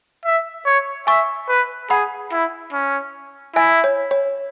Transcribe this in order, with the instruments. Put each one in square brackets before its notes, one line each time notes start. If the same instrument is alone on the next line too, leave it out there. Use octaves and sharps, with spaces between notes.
[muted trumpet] E5
C#5
[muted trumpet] E5 [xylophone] G#5 C#6
[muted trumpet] B4
[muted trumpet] G#4 [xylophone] F#5 B5
[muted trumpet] E4
C#4
[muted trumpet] E4 [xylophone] E5 G#5
[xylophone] C#5
C#5